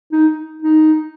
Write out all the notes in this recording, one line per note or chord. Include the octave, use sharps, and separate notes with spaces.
D#4
D#4